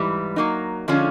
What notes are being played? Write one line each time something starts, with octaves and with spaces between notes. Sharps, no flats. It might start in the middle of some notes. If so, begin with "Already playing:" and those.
Already playing: G#2 E3 G3
F#3 A#3 D#4
D3 F3 G#3 C#4 F4